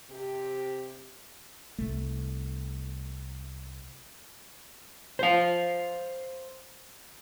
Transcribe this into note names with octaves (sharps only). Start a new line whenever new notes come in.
C3 G4
C2 A3
C5 F5